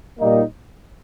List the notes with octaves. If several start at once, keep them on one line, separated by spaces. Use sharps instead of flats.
A#2 G3 A#3 D#4